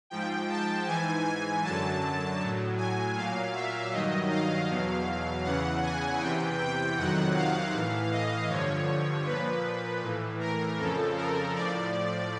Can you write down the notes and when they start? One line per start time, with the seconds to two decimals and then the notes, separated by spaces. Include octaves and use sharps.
0.10 G#2 F3 G5
0.49 A5
0.87 G#2 E3 G#5
1.25 G#5
1.63 F#2 D3 F#3 A5
2.40 A2 F#3
2.77 G#5
3.15 A#2 F#3 F5
3.54 E5
3.92 G2 D#3 F#3 D#5
4.30 F5
4.68 E2 B2 F#3
5.44 E2 C#3 E3 F#5
5.83 G#5
6.20 E2 C3 E3 G5
6.58 G5
6.97 F2 C3 D#3 F#3 F#5
7.34 F5
7.74 A2 E3
8.11 D#5
8.49 G2 D3 F3 C#5
9.25 A#2 F3 B4
10.02 A2 E3
10.40 A#4
10.78 F2 C#3 F3 A4
11.16 A#4
11.54 A2 F3 D5